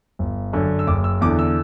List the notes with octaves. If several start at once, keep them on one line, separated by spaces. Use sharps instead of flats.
G1
F#2 D3
E6
F#1 D6
E6
E2 D3 D6
E6